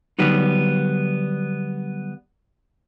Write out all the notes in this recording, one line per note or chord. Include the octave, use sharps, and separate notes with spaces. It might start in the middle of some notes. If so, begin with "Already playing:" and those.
D3 F#3 G3 B3 D#4